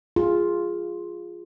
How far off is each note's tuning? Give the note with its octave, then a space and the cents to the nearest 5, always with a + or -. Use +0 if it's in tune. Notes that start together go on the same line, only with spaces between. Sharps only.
F4 +0 G#4 -10